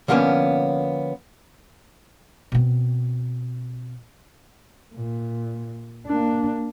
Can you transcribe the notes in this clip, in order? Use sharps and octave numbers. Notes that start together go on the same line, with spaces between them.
D3 F3 A#3 B3 C#4
B2 C4
A#2
A#3 D4